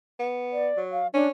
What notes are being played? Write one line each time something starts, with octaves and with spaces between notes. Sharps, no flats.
B3
D5
F#3
F5
C#4 D4